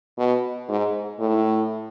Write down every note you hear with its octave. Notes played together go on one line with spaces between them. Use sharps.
B2
G#2
A2